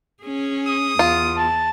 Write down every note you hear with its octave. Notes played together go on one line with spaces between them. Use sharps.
C#4 G#4
D#6
E2 F4
A5